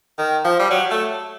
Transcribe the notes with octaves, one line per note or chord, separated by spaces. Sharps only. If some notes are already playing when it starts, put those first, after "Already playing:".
D#3
F3
G3
F#3
A3